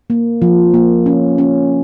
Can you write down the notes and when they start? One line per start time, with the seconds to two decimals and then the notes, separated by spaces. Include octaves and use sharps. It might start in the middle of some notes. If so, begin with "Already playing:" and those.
0.10 A#3
0.42 F3
0.74 A#3
1.06 C#4
1.38 C#4